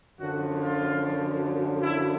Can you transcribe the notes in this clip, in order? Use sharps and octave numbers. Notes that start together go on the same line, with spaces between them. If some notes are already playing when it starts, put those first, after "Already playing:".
F#2 D3 F3 F#4
F4
E4